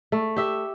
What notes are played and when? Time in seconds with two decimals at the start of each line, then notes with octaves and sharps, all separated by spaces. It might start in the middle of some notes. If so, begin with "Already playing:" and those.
0.12 A3
0.36 G4 E5